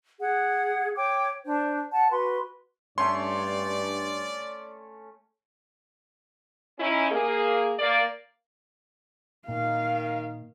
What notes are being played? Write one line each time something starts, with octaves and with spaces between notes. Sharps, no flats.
G#4 F#5
C#5 G5 D6
D4 C5
F#5 A5
F#4 B4 C6
G2 A3 C#4 C#5 D5 C6
C#4 D#4 E4
A#3 G#4
A#3 D5
A#2 D#3 F5